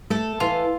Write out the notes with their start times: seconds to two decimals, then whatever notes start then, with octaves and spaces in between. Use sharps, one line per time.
0.10 A3 A4
0.40 E3 F4